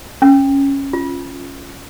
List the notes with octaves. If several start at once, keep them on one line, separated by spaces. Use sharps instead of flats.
C#4
F4